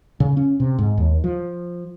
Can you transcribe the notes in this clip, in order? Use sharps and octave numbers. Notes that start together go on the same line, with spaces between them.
C#3
C#4
C3
G#2
D#2
F3